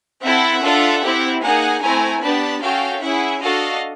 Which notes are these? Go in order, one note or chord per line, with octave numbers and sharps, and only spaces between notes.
C4 E4 A4 E5 F#5
D4 F4 A4
C4 E4 G4
A#3 D#4 G#4 F#5 G#5
A3 C4 E4 G#5 A#5
B3 D4 G4 A5 B5
C#4 F#4 A4 F5 G5
C#4 E4 G#4 E5 F#5
D4 F#4 A4 D#5 F5